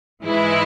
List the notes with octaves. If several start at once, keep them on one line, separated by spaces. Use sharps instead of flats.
G#2 E3 G#3 E4